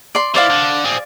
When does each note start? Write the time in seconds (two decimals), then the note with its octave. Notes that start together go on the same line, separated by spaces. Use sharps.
0.15 D5 C6
0.35 E3 C5 D5 F5
0.50 D3
0.85 C4 G#4